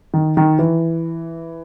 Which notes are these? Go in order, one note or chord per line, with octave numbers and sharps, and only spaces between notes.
D#3
D#3
E3